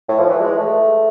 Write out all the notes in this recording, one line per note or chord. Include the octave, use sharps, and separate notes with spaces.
A2
F3
E3
G#3
A3